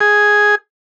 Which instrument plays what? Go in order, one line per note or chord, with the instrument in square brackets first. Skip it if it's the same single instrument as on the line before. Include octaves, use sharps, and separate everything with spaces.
[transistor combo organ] G#4